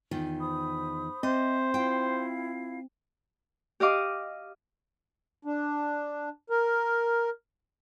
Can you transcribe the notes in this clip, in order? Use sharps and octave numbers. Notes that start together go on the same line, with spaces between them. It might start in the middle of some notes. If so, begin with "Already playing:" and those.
E2 D#3 F4
C5 B5 D#6
C4 C5 D#5 E5
E4 F4 F5 G5
G4 D#5 F5 D6
D4
A#4